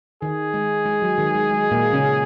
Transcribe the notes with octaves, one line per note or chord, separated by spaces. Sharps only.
D#3 G#4
G#3
G#3
F#3
D#3
G#3
G#3
A#2 A#3
C#3 C#4